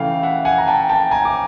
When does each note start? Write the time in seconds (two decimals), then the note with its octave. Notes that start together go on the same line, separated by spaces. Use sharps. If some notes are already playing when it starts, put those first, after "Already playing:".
Already playing: C#3 E3 A3 F5 G5
0.23 E5 F#5
0.45 F#5 G#5
0.58 A#5
0.68 G5 A5
0.89 G5 A5
1.11 G#5 A#5
1.25 D6